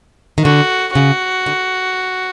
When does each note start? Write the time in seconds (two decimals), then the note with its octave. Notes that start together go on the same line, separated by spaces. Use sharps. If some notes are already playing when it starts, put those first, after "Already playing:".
0.38 D#3
0.44 D3 F#4
0.95 C#3 F#4
1.46 D3